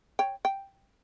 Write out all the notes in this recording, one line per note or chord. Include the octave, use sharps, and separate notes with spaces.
C#5 G5
G5